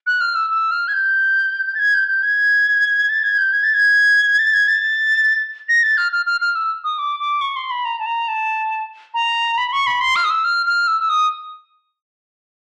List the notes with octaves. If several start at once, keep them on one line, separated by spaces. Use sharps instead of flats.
F#6
F6
E6
E6
F6
G#6
G6
A6
G#6
G6
G6
G#6
A6
G#6
G6
G#6
A6
G#6
A6
G#6
A6
A#6
A6
F6
F6
F6
F6
E6
D#6
D6
D6
C#6
C6
B5
A#5
A5
A#5
A5
A#5
B5
C#6
B5
C6
F6
D#6
E6
F6
F6
E6
E6
D#6